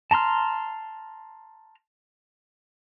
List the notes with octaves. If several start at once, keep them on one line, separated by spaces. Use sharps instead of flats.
A5 A#5 C6 F6